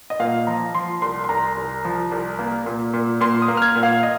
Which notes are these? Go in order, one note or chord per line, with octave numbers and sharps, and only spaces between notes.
D#5
A#2 F5
F3 A#5
F3 C6
C2 C6
C6
C2 A#5
C2
F3
C2
A#3
A#2
A#2
A#2 C6
D#6
A#3
F6
G#6
A#2
F5
D#5